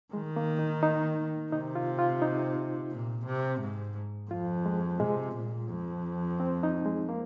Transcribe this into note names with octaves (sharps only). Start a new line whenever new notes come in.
D#3 G#3
A#3
D#4
D#4
C3 D#4
F4
F4
D#4
A#2
C3
G#2
F2 F4
G#3
C3 G#3
A#2
F2
C4
D#4
G#3
A#3